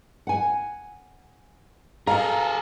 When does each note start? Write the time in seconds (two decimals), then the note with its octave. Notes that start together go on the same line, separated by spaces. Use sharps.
0.27 F#5 G#5
2.07 G#4 A4 F5 A#5